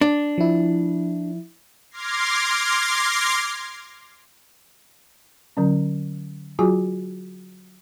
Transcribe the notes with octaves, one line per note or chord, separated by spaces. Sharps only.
D4
F3 E4
C6 D6 F6 G#6 A#6 C7
D3 F#3 C#4
F#3 F4 F#4 G#4 G#5